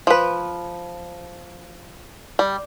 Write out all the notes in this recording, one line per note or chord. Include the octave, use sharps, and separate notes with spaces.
F3 B4
G3